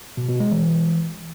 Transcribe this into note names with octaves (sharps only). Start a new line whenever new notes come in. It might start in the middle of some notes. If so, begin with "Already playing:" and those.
B2
B2
G#3
E3